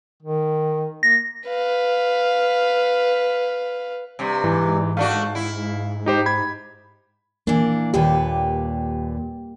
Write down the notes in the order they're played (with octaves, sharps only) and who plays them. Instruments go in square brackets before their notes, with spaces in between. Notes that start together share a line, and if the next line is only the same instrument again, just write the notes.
[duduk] D#3
[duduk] A#3 [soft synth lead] A#6
[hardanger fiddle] B4 F5
[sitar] G2 C3
[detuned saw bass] G#2 [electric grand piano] E3
[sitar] A3 D4 F#4 [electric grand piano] F5
[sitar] E4
[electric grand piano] D#4 G4 C5
B5 G#6
[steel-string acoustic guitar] E3 D4 [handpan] A#3
[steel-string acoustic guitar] D#2 A#2 B4 [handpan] G4